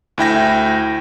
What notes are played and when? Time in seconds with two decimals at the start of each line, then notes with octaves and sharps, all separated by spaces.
0.18 D2 E4 G5 A#6